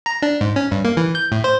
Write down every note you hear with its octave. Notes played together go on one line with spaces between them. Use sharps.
A#5
D4
G#2
C#4
G2
A#3
E3
G6
A2
C5